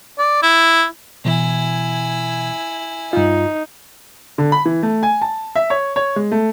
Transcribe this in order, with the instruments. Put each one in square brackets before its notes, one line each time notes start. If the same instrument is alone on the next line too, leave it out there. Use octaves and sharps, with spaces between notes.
[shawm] D5
E4
[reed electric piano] B2 E3 [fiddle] E4 G#5
[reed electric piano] G2 F4 [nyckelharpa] D#4
[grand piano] D3
B5
E3
A3
G#5
A5
E5
C#5
C#5
G#3
A3